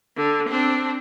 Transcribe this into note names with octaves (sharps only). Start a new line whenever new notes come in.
D3
C4 D4